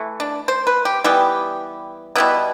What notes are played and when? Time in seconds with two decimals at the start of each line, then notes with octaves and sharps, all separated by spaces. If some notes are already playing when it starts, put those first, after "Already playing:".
Already playing: E3 A3
0.20 D4
0.48 C5
0.67 B4
0.85 G4
1.04 E3 G3 B3 G4
2.16 B2 G3 B3 E4